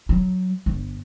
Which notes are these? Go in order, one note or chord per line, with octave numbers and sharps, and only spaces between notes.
F#3
G1